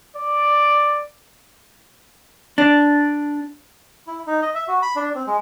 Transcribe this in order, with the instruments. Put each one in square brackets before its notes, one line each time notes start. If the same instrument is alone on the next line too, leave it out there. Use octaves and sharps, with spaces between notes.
[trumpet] D5
[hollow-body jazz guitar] D4
[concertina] E4
D#4
D#5
E5
F#4
B5
D4
C4
G#3